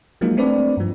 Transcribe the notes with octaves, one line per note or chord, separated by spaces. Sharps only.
F3 F#3 G#3 A#3 D#4
A3 C4 D4 B4 D5
G2 F3